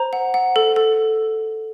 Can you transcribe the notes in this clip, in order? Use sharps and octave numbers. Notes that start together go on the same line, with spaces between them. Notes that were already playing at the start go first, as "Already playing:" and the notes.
Already playing: C5 A#5
F#5
F#5
A4
A4